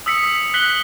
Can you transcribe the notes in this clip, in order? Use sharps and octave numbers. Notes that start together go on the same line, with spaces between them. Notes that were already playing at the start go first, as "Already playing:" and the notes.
D#6 E6 B6 C#7
F#6 B6 F#7 G7